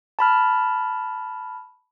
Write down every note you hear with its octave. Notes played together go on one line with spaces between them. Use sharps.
A5 B5 F6